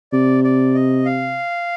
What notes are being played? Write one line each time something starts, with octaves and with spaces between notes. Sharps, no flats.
C3 D5
D5
D#5
F5